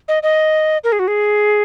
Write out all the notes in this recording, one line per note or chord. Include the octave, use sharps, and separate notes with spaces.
D#5
D#5
A#4
G#4
F#4
G#4